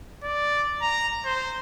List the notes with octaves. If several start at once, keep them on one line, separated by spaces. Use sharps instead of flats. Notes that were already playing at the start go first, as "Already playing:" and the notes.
D5
A#5
C5